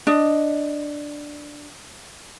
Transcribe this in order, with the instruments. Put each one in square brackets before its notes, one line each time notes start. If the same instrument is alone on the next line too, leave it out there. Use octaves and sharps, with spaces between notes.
[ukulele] D4 D#5